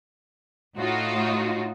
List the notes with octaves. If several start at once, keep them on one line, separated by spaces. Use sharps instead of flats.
A2 D#4 F4 F#4